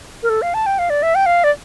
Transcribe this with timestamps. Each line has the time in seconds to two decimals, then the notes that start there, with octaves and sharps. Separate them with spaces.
0.23 A#4
0.29 A4
0.42 F5
0.54 A5
0.66 G5
0.79 F5
0.90 D5
1.03 E5
1.15 G5
1.26 F5
1.44 D5